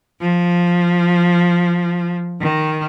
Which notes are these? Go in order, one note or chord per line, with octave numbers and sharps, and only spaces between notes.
F3
D#3